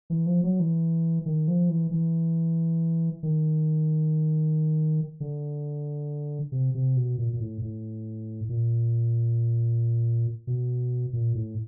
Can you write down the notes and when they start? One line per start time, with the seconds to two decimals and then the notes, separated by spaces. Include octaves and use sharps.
0.10 E3
0.26 F3
0.44 F#3
0.60 E3
1.26 D#3
1.48 F3
1.69 E3
1.91 E3
3.23 D#3
5.20 D3
6.52 C3
6.74 C3
6.96 B2
7.18 A#2
7.33 A#2
7.40 A2
7.62 A2
8.49 A#2
10.47 B2
11.13 A#2
11.35 A2